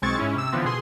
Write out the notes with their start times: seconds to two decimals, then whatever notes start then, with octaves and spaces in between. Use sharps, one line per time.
0.02 B1 G#3 C4 C#6 G#6 A6
0.18 G#2 C#4 E4
0.36 C3 E6
0.52 D3 E3 F3 B3 C4
0.65 B2 G#4 C6